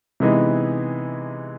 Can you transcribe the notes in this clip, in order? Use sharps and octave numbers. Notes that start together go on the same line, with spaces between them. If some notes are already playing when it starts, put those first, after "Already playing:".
C3 E3 G#3 B3 D#4